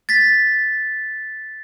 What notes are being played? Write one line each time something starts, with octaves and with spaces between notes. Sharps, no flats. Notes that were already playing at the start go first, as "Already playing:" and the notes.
A6 B6